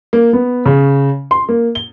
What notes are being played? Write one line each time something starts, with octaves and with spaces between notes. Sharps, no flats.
A#3
B3
C#3
C6
A#3
G7